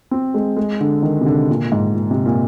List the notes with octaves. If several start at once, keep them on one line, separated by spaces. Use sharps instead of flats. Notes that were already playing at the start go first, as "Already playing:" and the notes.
C4
G#3
G#3
D3
D#3
C3
D3
A#2
G#2
A#2
C3
A#2